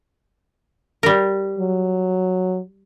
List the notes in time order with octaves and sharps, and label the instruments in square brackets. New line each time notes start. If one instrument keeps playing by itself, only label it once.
[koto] G3 A#4
[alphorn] F#3